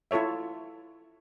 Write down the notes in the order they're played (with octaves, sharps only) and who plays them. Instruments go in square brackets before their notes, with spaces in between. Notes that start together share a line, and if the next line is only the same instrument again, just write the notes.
[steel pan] E4 F4 A4 C#5 E5